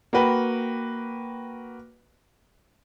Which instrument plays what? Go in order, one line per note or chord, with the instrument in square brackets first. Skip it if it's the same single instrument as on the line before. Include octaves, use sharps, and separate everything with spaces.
[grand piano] A#3 F#4 B4 G5